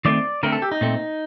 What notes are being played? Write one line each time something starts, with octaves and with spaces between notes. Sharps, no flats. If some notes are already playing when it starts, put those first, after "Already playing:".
D#3 A3 C4 D5
D3 A3 C4 A#4
A4
G4
D#4
A#2 A3 C4